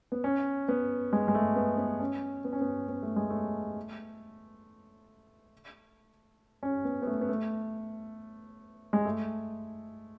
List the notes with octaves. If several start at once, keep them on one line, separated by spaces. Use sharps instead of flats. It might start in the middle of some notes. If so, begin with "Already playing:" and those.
B3
C#4
B3
G#3
G#3
A3
B3
B3
C#4
B3
C#4
B3
B3
A3
G#3
A3
C#4
B3
B3
A3
B3
A3
G#3
A3